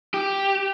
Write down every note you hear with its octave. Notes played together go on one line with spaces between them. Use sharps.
G4